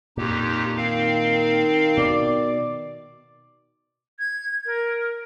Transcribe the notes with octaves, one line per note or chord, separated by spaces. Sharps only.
F2 A#2 D#4 G4
D#3 C4 F5
B2 D5
G#6
A#4